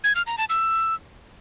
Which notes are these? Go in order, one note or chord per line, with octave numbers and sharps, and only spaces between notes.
G#6
F6
A#5
A5
E6